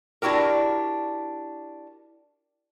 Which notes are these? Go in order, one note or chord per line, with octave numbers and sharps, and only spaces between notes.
D4 E4 F#4 G4 A#4